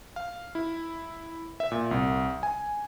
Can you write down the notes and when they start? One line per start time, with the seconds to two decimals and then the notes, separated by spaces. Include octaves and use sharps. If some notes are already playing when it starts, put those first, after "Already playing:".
0.16 F5
0.55 E4
1.60 E5
1.72 A#2
1.91 C2
2.43 G#5